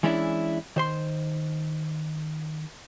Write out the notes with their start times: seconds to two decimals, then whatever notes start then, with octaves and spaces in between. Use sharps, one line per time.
0.03 E3 G#3 C#4 D4 E4
0.76 D#3 C5 C6